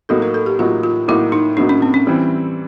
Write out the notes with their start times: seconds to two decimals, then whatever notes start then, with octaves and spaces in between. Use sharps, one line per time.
0.09 A2 F#3 A#3 D#4 F#4 A4
0.22 A#4
0.34 A4
0.46 G4
0.59 A2 F#3 A#3 D#4 F4 F#4
0.83 F4
1.08 A2 F#3 A#3 D#4 E4 F#4
1.32 D#4
1.57 A2 F#3 A#3 D4 D#4 F#4
1.69 C#4
1.82 C4
1.94 C#4
2.07 E3 G3 C4 E4